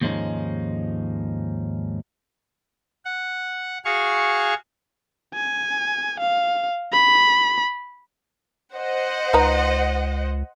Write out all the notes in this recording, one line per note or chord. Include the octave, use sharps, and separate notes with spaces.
D#2 G#2 F3 G#3 C#4 D#4
F#5
F#4 G#4 F5 C#6
G#5
F5
B5
C5 D#5 F#5
C#2 D#4 B4 A#5